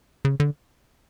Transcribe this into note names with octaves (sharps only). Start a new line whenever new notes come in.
C#3
D3